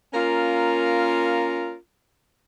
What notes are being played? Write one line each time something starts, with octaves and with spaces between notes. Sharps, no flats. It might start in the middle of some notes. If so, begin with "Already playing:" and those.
A#3 C#4 F4 A#4